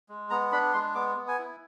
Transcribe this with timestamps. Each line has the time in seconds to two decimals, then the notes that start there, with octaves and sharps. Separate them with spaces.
0.09 G#3
0.30 B3 A#5
0.52 D4 B5
0.73 G#3 C6
0.95 B3 D6
1.17 B3
1.28 G#5
1.39 E4